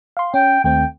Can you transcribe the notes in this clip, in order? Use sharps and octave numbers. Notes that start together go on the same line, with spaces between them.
F5 C6
C#4 G5
D#2 A3 C4 G5